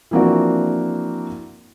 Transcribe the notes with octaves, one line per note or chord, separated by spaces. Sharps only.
E3 F3 A#3 C4 D4 F#4